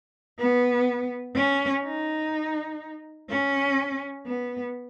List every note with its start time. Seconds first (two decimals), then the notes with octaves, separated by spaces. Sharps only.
0.39 B3
1.35 C#4
1.83 D#4
3.29 C#4
4.26 B3